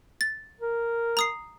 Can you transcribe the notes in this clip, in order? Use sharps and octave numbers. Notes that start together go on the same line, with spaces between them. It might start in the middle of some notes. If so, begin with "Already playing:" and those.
A6
A#4
A#5 D#6 C7